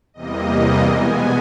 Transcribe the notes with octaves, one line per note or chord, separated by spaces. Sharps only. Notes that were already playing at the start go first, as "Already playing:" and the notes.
E2 C3 E3 G3 A#3 D#5
B2 G#3 B3 G#5